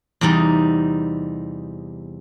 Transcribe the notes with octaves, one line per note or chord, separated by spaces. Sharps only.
E2 C3 G3 D#4